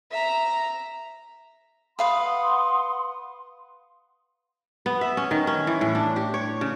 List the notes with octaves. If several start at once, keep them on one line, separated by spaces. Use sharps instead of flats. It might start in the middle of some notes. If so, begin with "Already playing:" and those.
E5 A#5
B4 F5 F#5 B5 C6 D#6
B3
E5
C#4
D#3
C#4
E3
A2
D4
G4
C#5
C#3